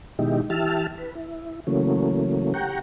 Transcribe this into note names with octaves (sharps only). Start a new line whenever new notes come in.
B2 D#3 G#3 D#4 E4 G4
E3 G4 E5 A5 F6
B4
E4
C#3 E3 F#3 A3 A#3 C#4
G4 F#5 G5 A#5 C#6